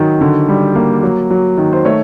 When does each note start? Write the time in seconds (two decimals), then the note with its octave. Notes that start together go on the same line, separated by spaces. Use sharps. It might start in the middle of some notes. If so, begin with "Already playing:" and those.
Already playing: D#3 F#3
0.21 D3
0.49 G3
0.75 A#3
1.03 F#3
1.31 F#3
1.58 D#3
1.73 C5
1.85 A3 C#5